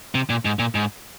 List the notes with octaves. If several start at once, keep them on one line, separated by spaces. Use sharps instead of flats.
C3
A#2
G#2
A#2
G#2